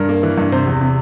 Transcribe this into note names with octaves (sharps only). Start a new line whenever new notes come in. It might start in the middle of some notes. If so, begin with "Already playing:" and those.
Already playing: G2 A#4
A#3
E3
G2
C3 C5
E2
C3